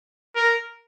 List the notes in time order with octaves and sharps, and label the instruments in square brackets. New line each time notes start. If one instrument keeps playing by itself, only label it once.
[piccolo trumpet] A#4